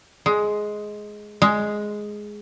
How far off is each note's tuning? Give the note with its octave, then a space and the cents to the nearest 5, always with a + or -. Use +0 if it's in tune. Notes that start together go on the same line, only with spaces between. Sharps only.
G#3 +10
G#3 +5